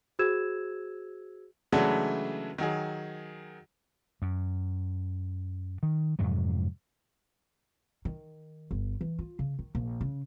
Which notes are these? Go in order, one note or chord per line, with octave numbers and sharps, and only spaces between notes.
F#4 G#4 C5 E6 G#6 E7
C#3 E3 F#3 G#3 A3 D4
D#3 F#3 G#4
F#2
D#3
F2 G#2 C3 F#3
D#3
G1
E3
F4
C#3
D#3
A#1
C#3